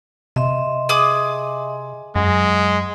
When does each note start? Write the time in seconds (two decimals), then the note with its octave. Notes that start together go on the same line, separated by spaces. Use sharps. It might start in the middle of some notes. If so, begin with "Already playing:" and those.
0.36 C3 D#5 E5 C6
0.89 G#4 D6 D#6
2.15 F#2 F#3 G#3